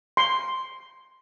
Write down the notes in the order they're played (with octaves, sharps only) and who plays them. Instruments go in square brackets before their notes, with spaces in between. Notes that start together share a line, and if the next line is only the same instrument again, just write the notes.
[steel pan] C6